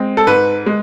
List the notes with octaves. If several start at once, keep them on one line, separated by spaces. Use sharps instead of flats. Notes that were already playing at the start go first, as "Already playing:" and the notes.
Already playing: G#3 C4
A4
G#2 B4
G#3